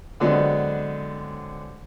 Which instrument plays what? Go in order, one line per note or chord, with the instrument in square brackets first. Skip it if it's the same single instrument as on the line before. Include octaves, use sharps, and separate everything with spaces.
[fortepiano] D3 F#3 G#3 B3 C4 D4